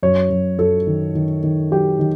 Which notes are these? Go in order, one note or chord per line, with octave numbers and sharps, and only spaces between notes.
F#2 C#5
F#2
F#2 A4
D#3
D#3
D#3
F#3 G4
D#3